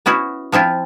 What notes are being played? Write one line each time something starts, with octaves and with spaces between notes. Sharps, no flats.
B3 C#4 E4 F#4
F3 C4 E4 F4